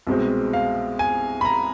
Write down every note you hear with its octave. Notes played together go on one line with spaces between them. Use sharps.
C2 B2 G#3 C4
F5
G#5
B5
A#5